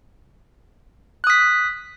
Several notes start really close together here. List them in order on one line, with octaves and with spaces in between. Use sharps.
F#6 D#6 B6